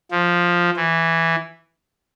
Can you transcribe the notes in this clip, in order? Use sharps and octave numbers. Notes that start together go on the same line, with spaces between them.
F3
E3